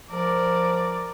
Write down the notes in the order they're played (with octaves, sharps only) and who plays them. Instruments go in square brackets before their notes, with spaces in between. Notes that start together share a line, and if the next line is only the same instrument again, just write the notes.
[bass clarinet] F3 [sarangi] A#4 [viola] D5